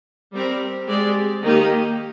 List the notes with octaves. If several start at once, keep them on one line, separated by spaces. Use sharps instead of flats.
G3 C4 G4 A#4
G#3 C4 G4 D5
D#3 A#3 D#4 G4